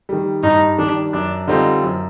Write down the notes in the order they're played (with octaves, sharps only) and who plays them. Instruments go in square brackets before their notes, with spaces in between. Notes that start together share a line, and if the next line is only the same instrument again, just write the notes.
[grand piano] D#3 G3
[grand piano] G2 [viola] D#4
[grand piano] D#3 G3 [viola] D4
[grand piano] F#2 [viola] D4
[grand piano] D3 G3 C4 F4 [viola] D#4
[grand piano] F#2